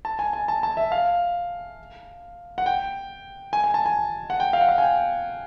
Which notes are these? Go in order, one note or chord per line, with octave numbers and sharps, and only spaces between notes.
A5
G#5
G#5
A5
A5
E5
F5
F#5
G5
G#5
G#5
A5
G#5
F#5
G5
F5
F#5
F5
G#5
G5